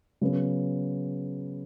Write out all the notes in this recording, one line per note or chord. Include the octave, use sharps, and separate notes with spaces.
C#3 F#3 B3